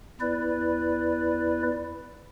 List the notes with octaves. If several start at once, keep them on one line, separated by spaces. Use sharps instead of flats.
E2 E4 B4 D5